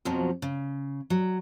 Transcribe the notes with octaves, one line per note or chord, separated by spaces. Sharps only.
F2 B2 F3 F#3
C#3
F#3